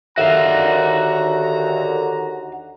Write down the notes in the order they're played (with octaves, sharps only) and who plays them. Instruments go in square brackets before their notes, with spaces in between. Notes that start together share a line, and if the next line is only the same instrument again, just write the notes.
[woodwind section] D#2 D3 [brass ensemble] D#3 A#5 [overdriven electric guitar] F#4 F5 [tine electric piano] E5